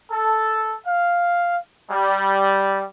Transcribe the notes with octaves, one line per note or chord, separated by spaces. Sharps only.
A4
F5
G3